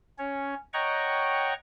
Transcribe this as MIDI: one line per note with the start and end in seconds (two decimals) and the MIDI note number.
0.18 0.54 61
0.18 0.54 73
0.73 1.54 73
0.73 1.54 75
0.73 1.54 78
0.73 1.54 79
0.73 1.54 82
0.73 1.54 85